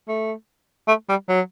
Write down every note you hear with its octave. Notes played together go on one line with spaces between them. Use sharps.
A3
A3
G3
F#3